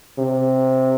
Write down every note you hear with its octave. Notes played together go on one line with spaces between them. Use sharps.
C3